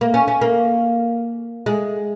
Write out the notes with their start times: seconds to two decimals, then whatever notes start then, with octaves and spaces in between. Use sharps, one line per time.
0.01 A#3
0.14 C#4
0.28 C#4
0.41 A#3
1.66 G#3